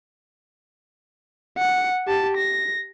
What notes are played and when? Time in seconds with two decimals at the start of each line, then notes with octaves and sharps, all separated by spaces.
1.58 F#5
2.08 G4 A5
2.37 A#6